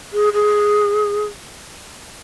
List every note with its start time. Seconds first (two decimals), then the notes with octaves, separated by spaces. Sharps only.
0.13 G#4
0.33 G#4